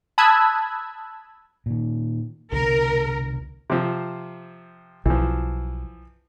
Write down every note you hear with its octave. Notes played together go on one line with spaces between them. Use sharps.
A5 B5 D#6 E6 F#6 G#6
A#2 D#3
C2 B2 D3 A#4
C3 F3
B1 E3 F3